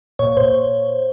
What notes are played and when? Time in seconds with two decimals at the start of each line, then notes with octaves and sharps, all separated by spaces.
0.19 A#2 C#5
0.37 A#2 C5